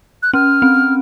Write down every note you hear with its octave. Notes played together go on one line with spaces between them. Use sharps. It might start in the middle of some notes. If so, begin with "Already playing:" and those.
F#6
C#4 F6
C4